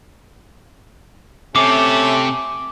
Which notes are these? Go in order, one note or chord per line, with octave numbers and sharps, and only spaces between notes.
C3 A3 C#4 D6